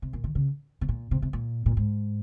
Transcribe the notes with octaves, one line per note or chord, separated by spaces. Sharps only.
C3
A#2
D#3
C#3
C3
A#2
C3
C3
A#2
A#2
G#2